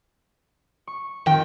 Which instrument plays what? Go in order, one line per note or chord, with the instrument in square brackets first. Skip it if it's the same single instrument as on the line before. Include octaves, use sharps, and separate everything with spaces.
[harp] C#6
[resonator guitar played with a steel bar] F2 G5 [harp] D#3